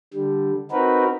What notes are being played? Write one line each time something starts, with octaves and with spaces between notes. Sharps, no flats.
D3 G3
C4 D#4 F#4 A#4 B4